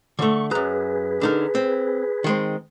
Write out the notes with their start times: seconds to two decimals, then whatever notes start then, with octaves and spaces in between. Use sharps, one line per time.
0.19 D3 A3 C#6
0.51 F#2 G#4 B4 A#5
1.21 D3 D#4 A#4
1.55 C4
2.24 D#3 G#3 C4